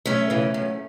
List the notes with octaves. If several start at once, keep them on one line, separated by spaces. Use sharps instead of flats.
F#2 A3 C#4
C#3 E3
F#2